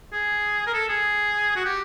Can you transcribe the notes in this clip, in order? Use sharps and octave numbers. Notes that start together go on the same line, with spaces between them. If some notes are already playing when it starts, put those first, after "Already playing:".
G#4
A#4
A4
G#4
F#4
G4